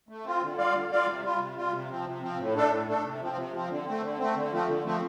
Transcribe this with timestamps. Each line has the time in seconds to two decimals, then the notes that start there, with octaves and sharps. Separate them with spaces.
0.09 A3
0.25 C4 F4
0.42 D3
0.57 G3 F4 D5 F5
0.74 D3
0.91 G3 F4 D5 F5
1.06 C3
1.23 G3 F4
1.39 C3
1.56 G3 F4
1.73 C3
1.89 F3 C4
2.05 C3
2.22 F3 C4
2.38 A2
2.55 A3 D4 A4
2.70 A2
2.87 A3 D4 A4
3.04 C3
3.21 F3 C4
3.36 C3
3.52 F3 C4
3.69 D3
3.86 A3 C4
4.02 D3
4.19 A3 C4
4.35 D3
4.51 F3 A3 C4
4.68 D3
4.84 F3 A3 C4